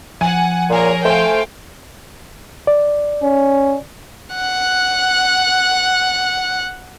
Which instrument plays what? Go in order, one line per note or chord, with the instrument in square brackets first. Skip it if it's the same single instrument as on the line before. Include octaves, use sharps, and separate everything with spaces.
[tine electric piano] F3 [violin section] F#5 [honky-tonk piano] G#5
[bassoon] A#2 [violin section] G#4 A#4 C#5
[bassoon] A3 [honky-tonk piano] C5 G#5 [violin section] F5 G5
[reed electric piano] D5
[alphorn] C#4
[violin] F#5 F#6